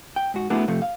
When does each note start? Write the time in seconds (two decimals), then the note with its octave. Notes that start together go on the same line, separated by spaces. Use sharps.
0.16 G5
0.34 G#2 F#4
0.50 A3 B3 D4 E4 F#4 G#4
0.68 C3 F3 A3
0.82 F5